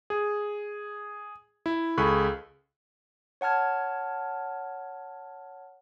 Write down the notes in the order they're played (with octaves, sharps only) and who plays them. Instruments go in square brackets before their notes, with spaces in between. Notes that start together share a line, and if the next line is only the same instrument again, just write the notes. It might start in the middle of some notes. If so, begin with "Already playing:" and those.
[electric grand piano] G#4
E4
C#2 G#4 A4 B5 C#6 F#6
[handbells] C#5 F#5 A5 F6 G#6